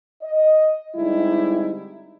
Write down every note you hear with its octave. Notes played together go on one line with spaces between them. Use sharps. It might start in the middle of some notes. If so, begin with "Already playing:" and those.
D#5
D3 G3 G#3 C4 D#4 E4